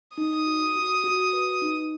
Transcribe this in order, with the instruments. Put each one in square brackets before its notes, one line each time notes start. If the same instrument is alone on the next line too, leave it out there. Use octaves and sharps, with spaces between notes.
[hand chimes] D#4 [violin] D#6
[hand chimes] F#4
F#4
F#4
B4
D#4